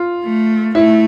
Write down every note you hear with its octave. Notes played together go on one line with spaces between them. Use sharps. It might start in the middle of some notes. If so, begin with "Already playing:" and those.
Already playing: F4
A3
A3 E4